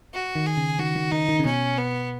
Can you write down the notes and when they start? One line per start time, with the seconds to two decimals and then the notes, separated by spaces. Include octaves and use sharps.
0.14 F#4
0.35 D#3
0.46 G#4
0.57 C#3
0.79 D#3 F#4
0.96 D#3
1.11 D#3 D#4
1.29 D#3
1.39 C#3
1.45 B2 C#4
1.78 B3